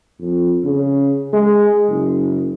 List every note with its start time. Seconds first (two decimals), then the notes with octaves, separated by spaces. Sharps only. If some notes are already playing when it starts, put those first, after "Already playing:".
0.20 F2
0.64 C#3
1.33 G#3
1.89 F#1